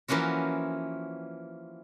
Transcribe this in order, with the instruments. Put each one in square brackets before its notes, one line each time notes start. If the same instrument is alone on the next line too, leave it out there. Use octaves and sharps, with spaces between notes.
[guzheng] E3 F3 A#3 C#4 F#4